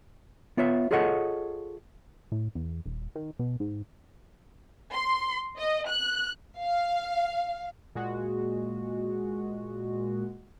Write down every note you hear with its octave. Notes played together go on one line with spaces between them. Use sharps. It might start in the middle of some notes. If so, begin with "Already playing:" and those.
B3 F4 C#5 E5
F4 G#4 A4 C#5 D#5 F#5
A2
E2
D#1
D#3
B2
G#2
C6
D#5
F#6
F5
A#2 G#3 F#4